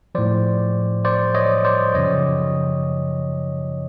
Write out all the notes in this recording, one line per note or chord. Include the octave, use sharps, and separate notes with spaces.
A2 F3 C5 D5
C5 D5
C#5 D#5
C5 D5
F#2 C#3 F3 C#5 D#5